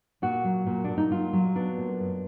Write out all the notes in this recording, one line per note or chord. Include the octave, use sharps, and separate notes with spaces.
A#2 F#4
F#3
A#2
A#2 D4
D#4
F#3 F4
F#3
B3 D4
A#2
F#2